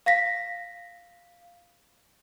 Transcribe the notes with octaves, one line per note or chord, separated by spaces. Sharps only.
F5 A#6 B6